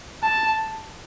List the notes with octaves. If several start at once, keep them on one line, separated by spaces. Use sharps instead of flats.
A5